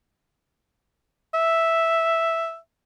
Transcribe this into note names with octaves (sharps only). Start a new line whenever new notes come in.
E5